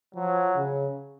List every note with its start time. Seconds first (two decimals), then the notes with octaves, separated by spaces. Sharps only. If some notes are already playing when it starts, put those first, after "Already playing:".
0.14 F3 F#3
0.56 C#3